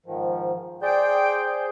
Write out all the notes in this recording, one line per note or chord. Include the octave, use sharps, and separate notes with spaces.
G#2 D#3 F3
G#4 C5 D5 G5 G6